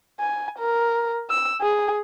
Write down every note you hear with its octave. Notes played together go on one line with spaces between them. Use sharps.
G#5
A#4
E6
G#4